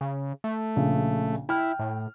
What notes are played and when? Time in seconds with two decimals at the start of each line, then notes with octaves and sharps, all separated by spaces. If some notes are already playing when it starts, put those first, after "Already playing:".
0.01 C#3
0.44 A3
0.76 A#1 C#3
1.49 E4 G5 F6
1.79 A2